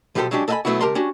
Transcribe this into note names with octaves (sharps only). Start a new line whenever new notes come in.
B2 F3 F#3 G4 A4 C5
F#3 G#3 C#4 D4 G4
A4 D#5 E5 F#5 G#5 B5
B1 F#3 A3 B3 E4 F#4
C#2 G4 A#4 A5 A#5 C6
C#4 D4 F#4 G4